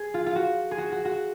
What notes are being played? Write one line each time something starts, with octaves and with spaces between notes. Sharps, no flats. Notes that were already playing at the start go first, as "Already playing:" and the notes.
Already playing: G#4
F4
F4
F#4
G#4
F#4
F#4
F#4